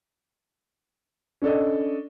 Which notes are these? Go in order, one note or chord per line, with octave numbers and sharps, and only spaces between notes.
C#4 D4 A4 D5 D#5